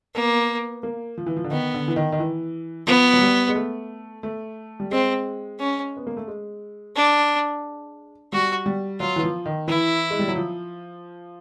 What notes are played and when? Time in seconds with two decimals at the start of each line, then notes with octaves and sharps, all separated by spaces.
0.15 A#3 B3
0.83 A#3
1.17 F3
1.26 E3
1.36 F3
1.44 D3
1.51 D#3 B3
1.74 D3
1.88 E3
1.96 D#3
2.12 D#3
2.19 E3
2.87 F3 B3
3.13 F#3
3.21 G3
3.49 G#3
3.55 A3
4.23 A3
4.80 G3
4.91 G#3 C4
5.60 C#4
5.97 B3
6.07 A#3
6.17 A3
6.28 G#3
6.96 D4
8.33 G3 F#4
8.66 G3
9.00 F#3 F4
9.16 E3
9.23 F3
9.46 D#3
9.68 E3 E4
10.10 G#3
10.19 G3
10.28 F#3
10.36 F3